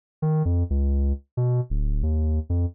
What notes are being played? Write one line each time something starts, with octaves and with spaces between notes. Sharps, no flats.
D#3
F2
C#2
B2
D1
D#2
F2